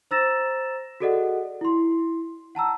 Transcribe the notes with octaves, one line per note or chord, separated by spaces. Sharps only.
C5 A#5 E6 A6 A#6 E7
F#4 G#4 A4 D5 D#5 F#5
E4 C6
F#5 A5 A#5 E6